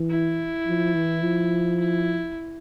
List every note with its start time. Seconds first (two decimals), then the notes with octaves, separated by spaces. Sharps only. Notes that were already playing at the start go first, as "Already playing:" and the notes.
Already playing: E3
0.10 E4
0.66 F3
0.95 E3
1.23 F3
1.80 E4